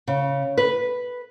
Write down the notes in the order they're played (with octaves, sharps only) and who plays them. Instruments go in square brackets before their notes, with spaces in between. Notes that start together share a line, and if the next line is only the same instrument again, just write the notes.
[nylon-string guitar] C#3
B4